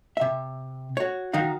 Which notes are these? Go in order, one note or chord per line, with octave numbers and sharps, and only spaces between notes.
C3 E5
F#4 C#5
D#3 D#4 F#4 F5